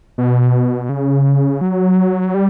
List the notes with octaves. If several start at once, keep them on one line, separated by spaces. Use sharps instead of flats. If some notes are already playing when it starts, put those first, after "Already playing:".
B2
C#3
F#3
G3